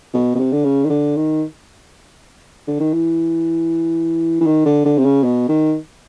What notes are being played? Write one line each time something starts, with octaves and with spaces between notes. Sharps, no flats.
B2
B2
C3
D3
C#3
D#3
D3
D#3
D3
D#3
E3
E3
D#3
D3
D3
C3
C#3
B2
D#3